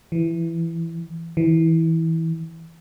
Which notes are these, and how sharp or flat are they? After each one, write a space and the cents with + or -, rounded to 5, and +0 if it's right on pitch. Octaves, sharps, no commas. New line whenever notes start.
E3 +10
E3 -20